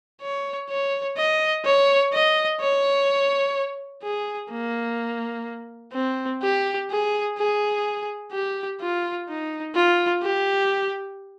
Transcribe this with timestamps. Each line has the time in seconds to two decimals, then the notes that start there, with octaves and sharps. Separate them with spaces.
0.22 C#5
0.70 C#5
1.17 D#5
1.65 C#5
2.13 D#5
2.61 C#5
4.03 G#4
4.51 A#3
5.94 C4
6.42 G4
6.90 G#4
7.38 G#4
8.32 G4
8.80 F4
9.29 D#4
9.75 F4
10.23 G4